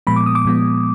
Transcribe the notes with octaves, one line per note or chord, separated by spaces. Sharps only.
A#2 F3 G#3 B3 B5
D6
D#6
D6
A#2 F3 G#3 B3